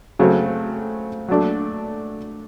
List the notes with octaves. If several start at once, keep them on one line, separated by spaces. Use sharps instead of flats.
C#3 F#3 A3 C4
F#3 A3 D4